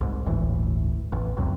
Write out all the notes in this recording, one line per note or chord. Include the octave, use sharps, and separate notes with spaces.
C2 G#2
G1 D2 A2 E3
A1 E2
C#2 F#2 A2 C3